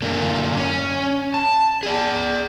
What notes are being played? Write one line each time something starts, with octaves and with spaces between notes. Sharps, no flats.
F#2 D3 A3 A#3 D4 A#4
C#4
A5
G#4 D5